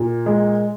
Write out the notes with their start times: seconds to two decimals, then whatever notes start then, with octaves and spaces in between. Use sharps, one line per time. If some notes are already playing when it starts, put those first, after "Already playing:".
Already playing: A#2
0.26 G#3